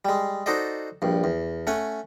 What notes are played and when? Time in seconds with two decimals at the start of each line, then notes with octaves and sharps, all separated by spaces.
0.05 G3 G#3
0.46 D#4 F#4 A4 C5 D5 D#5
1.02 A#1 G2
1.24 E2
1.67 A3 C#4 F#5 G#5